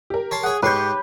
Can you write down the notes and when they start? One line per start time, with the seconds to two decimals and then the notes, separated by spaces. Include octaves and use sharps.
0.10 G4 A#4
0.31 C#5 A5 C6
0.43 G#4 C#5 F#5
0.63 G#2 G4 B4 C#5 C6 C#6 G6